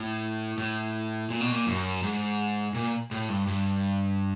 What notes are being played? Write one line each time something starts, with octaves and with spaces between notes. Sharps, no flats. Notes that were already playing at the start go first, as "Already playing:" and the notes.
Already playing: A2
A2
A#2
B2
A#2
F#2
G#2
A#2
A2
G2
G2